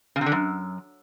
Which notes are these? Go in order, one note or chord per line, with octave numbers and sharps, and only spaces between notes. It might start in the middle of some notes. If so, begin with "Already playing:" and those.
C#3
C3
D3
F#2